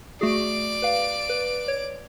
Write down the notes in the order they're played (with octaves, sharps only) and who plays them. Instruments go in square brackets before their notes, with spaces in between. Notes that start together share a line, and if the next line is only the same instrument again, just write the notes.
[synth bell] A3 F#4 G#4 [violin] D5 D7
[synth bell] B4 F5
B4
C#5